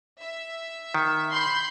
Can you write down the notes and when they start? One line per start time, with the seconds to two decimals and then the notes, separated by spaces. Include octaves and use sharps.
0.20 E5
0.94 D#3
1.33 B5 C6 G6